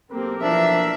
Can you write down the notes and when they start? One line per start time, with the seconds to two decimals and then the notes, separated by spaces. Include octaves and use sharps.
0.12 B1 A#3 C4 G4 A4 A#4
0.42 E3 F3 A#3 D4 E5